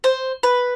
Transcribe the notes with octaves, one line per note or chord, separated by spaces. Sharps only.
C5
B4